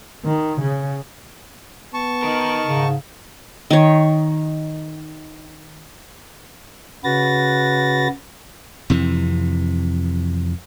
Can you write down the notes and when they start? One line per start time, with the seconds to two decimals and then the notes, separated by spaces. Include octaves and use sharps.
0.25 D#3
0.61 C#3
1.94 B3 A5 C#6
2.23 D#4 A#4
2.66 G#2 C#3
3.70 D#3 C#5
7.04 C#3 F#4 B4 A6 A#6
8.90 F2 C3 E3